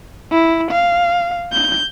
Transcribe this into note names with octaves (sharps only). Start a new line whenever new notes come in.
E4
F5
G6